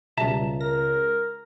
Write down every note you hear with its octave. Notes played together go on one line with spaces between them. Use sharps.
C#2 B2 G3 E5 A5 A#5
A#4 A#6